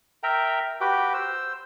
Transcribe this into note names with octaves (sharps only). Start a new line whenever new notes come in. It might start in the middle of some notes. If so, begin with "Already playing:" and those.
A#4 E5 G5 A#5
F#4 G4 B4 G5
C5 E6